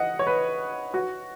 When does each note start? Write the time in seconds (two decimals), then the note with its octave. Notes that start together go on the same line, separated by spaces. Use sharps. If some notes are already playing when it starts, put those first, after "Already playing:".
Already playing: D#5 F#5
0.19 C#5
0.27 B4
0.94 F#4